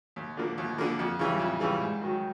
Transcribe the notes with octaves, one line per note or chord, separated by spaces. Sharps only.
D#2
D3 F3 A#3
D#2
D3 F3 A#3
F2
C#3 E3 G3
F2
C#3 E3 G3
G#2
D#3 F#3